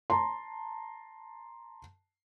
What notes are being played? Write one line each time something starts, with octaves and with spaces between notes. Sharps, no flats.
A5 A#5 C6